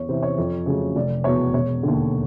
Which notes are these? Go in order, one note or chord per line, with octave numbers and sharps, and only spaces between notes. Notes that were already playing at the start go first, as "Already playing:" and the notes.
Already playing: E2 C#5
C3 E3 C5
C#5
F2
C#3 F#3 A3
F1 D5
E2 B2 C#5
E1 C#5
D#2 D3